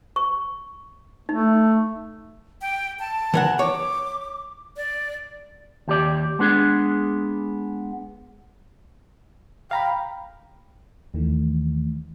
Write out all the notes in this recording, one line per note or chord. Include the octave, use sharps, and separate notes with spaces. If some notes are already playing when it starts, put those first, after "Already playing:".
C#6
A3 D#4
G5
A5
E3 A#4 F#5
C#5 D6
D5
D#2 G4 D5
G#3 B3 D4 G#4
F5 G5 A#5 B5
D#2 D#3 E3 A3